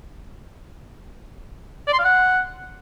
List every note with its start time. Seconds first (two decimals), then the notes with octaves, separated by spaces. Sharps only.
1.87 D5
1.93 C6
1.99 F5
2.05 F#5